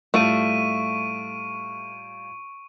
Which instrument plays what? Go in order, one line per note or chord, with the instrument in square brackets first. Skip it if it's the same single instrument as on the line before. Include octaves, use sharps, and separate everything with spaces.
[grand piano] A2 G3 F4 [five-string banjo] A3 [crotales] C#6 D7 D#7